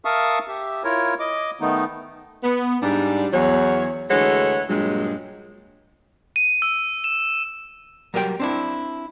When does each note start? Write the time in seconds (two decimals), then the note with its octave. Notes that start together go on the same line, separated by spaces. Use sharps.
0.05 A#4 E5 F5 A5 C#6 D#6
0.48 G4 E5
0.84 E4 F4 A#4 C#5
1.19 D#5 D6
1.60 D#3 A3 B3 D#4
2.43 B3
2.82 G#2 G3 D4
3.33 E2 F#3 C#5
4.10 D2 E3 G#3 A4 C#5 F#5
4.69 G2 A#2 F#3 G#3
6.36 D#7
6.62 E6
7.04 E7
8.14 F#3 G3 A#4 D#5 G5
8.40 C4 D4 E4